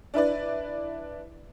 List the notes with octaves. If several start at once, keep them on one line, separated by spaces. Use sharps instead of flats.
D4 E4 B4 D5